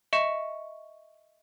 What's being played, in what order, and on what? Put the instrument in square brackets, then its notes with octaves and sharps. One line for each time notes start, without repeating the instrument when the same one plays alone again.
[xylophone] D#5 E5 C#6 C#7 E7